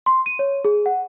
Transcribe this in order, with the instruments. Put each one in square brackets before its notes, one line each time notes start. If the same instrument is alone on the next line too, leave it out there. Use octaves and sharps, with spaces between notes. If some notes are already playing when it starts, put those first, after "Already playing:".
[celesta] C6
D#7
C#5
G#4
F#5